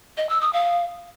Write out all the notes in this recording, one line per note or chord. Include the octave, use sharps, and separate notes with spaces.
D#5
E6
D#6
F5